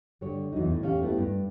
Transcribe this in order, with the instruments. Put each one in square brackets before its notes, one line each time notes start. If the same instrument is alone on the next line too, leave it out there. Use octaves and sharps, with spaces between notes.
[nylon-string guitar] G2 D3 C#5
E2 G#2 F#3 D#4
A2
E2 C#4 G4 F5
A3 B3 E4 G4
G2